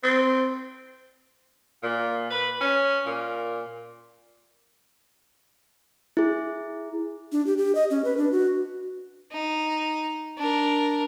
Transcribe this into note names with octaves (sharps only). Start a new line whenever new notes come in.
C4
A#2
B4
C#4
A#2
E4 G#4
D4
G4
G4
D#5
C#4
B4
D4
F#4
D#4
D4 A#4